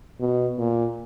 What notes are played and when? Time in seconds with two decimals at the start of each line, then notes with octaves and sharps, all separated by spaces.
0.20 B2
0.58 A#2